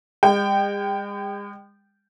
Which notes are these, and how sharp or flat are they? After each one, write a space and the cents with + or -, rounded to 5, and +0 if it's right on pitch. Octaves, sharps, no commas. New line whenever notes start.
G#3 -45 G5 +0